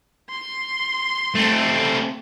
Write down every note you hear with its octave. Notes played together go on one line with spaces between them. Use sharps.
C6
A3 C4